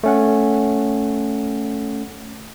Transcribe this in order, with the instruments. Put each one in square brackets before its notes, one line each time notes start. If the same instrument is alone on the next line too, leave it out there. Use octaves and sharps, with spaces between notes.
[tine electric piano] A3 C#4 F#5